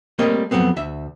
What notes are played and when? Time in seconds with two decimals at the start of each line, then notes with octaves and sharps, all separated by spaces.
0.19 G3 A3 A#3 C4 C#5 D#5
0.51 F2 F#3 A3 B3 C4
0.76 D2 E5